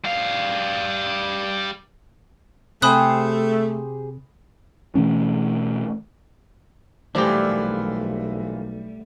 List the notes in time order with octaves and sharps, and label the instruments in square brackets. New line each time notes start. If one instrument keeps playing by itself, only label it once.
[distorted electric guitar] G3 F5
[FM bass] C3 [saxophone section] A3 [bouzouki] G4 G#4 C5 [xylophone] B5 D#6 F#6
[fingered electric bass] B2 E3 A3 C#4
[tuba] B1 [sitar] A#2 E3 F3 [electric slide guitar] G3 A3 [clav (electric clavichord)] D4 G4